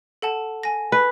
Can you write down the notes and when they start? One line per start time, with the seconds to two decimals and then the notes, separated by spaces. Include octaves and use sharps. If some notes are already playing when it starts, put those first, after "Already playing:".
0.22 A4 F#5 A5
0.63 G#5 A#6
0.92 B4